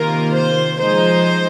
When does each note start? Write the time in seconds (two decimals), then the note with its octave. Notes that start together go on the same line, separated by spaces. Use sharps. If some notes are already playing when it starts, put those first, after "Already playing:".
Already playing: C3 D#3 A#3 F4 A#4
0.33 C5
0.77 F3 G#3 D#4 C5